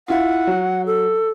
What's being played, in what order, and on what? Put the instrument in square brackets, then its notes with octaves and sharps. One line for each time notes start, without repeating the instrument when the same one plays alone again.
[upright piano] E4 F4 [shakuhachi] F#5
[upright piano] F#3
[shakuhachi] A4